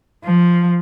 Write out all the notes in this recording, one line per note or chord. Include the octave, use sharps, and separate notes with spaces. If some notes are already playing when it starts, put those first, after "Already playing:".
F3